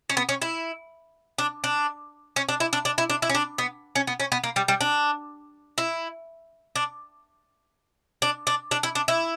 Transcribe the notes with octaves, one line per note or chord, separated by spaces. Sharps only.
C#4
B3
C#4
E4
D4
D4
C#4
D4
E4
D4
D4
E4
D4
E4
C#4
D4
B3
C#4
B3
C#4
B3
A#3
G3
G3
D4
E4
D4
D4
D4
D4
E4
D4
E4